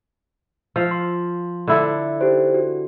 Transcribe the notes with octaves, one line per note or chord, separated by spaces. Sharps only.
F3 F5 E6
C6
D3 E4 A4
D#4 G4 C5
F#4